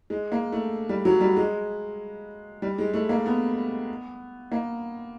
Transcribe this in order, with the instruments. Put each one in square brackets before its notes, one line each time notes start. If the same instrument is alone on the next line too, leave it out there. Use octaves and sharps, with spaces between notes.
[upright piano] G#3
A#3
A3
G3
F#3
G3
G#3
G3
G#3
A3
A#3
B3
A#3